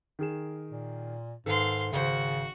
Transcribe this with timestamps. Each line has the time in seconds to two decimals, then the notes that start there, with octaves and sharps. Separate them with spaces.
0.19 D#3 G#4 E7
0.71 A#2
1.46 G#2 D#3 A4 B4 F5 C6
1.92 G#1 C#3 F#4 C5